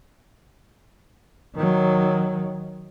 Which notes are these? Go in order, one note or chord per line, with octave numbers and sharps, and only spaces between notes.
D#3 F#3